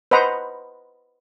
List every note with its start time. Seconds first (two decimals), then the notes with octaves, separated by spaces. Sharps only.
0.11 B4 C5 D#5 F#5 A#5